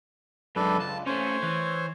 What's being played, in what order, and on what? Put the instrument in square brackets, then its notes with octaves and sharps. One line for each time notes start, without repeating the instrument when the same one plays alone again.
[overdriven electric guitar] F#2 G#3 [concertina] D4 A4 B4
[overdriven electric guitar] C#2 [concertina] A5
[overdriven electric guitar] A3 C#4 [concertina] C5 C#5
[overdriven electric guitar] E3